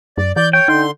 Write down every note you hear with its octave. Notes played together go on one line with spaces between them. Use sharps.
F#2 D5
E3 D5 G6
C#5 G5
D3 D#4 C6